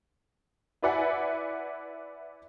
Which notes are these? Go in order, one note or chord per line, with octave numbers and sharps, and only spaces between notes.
E4 B4 D5 E5 F#5 G#5